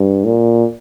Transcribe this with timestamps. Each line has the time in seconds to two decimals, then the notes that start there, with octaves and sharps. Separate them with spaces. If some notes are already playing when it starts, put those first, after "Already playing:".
Already playing: G2
0.25 A#2